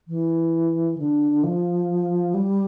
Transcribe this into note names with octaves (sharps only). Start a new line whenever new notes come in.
E3
D3
F3
G3